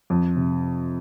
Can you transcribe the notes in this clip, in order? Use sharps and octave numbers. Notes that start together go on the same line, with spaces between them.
F2
C3